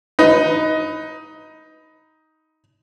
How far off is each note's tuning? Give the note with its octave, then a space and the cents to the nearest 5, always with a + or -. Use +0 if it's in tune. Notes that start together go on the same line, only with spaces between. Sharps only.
D#4 +15 B4 +15